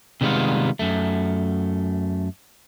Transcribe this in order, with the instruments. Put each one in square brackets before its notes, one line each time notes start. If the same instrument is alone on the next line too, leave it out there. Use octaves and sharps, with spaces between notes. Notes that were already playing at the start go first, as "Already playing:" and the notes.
[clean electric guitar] C3 D#3 G3 G#3 B3 F4
F#2 A3